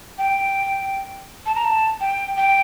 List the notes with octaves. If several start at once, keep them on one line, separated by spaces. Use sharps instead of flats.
G5
A5
A#5
A5
G5
G5